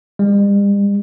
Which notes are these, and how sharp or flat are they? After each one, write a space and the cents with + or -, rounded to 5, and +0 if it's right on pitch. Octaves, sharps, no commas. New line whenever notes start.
G3 +45